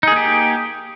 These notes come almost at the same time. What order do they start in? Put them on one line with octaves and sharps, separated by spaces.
D#4 G#4 A#3 G4